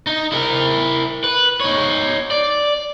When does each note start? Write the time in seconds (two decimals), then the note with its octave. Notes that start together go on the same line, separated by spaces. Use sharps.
0.07 D#4
0.32 E4 A#4
1.24 B4
1.60 D#4 C#5
2.31 D5